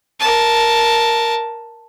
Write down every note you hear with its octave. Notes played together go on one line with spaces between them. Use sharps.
A#4 A5